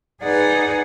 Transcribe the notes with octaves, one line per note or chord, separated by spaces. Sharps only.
D#4 G#4 B4 D5 F#5